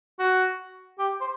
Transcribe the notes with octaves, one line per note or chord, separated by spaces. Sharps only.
F#4
G4
C5